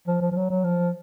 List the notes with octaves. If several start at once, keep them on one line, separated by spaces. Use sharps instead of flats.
F3
F3
F3
F#3
F#3
F3